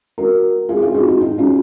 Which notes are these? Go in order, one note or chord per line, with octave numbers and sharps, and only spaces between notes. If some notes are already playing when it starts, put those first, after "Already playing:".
F#4 A#4
F4 G#4
F4 G#4
D#4 F#4
D#4 F#4
D#4 F#4
C#4 F4